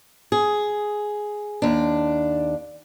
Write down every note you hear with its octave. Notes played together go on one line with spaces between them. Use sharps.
G#4
D#2 D4